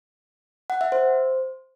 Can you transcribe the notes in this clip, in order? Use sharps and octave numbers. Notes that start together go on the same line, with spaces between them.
F#5
E5
C5